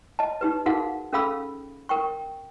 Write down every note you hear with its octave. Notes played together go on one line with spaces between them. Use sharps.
D#5 A5
D#4 G4 B4
D#4 F#4 G#4 A#4 F5 F#5
C#4 G#4 A4 F5 B5 E6
A#4 G5 C#6